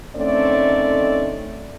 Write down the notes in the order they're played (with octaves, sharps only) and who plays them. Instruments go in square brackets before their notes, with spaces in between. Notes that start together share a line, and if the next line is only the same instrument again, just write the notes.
[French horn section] D3 D#3 A3 C4 C#4 D5